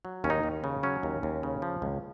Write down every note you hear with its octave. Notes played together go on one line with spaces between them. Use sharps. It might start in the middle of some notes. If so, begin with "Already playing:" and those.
F#3
D#2 C#4
D#4
D#2
C#3
F#3 C#4
D#2
D#2
C#3
F3
C#2